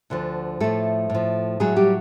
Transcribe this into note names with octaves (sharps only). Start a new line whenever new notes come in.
D2 D3 F3
A2 F3 A3 A4
A2 F3
A2 F#3 G#3 G#4
G3 G4